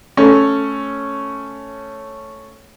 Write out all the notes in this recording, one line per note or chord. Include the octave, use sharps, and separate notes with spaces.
A3 C#4